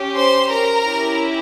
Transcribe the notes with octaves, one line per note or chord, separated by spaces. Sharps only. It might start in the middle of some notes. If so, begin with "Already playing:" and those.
Already playing: C#4 G4
C5 C6
A#4 A#5
C#4 E4 G4